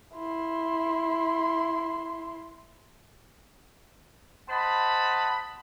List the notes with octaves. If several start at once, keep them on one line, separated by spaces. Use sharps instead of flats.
E4 C6
C5 D#5 F#5 A5 B5